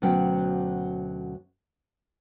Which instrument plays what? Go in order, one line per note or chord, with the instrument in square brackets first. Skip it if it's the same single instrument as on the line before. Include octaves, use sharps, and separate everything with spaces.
[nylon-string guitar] D2 B2 F#3 C#4 G5